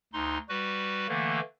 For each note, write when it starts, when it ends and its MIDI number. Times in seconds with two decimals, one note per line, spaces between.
0.13 0.38 38
0.13 0.38 63
0.13 0.38 84
0.49 1.07 55
0.49 1.07 66
0.49 1.07 71
1.09 1.40 50
1.09 1.40 52
1.09 1.40 57
1.09 1.40 58